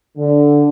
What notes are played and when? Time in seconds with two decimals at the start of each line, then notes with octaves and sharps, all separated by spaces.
0.18 D3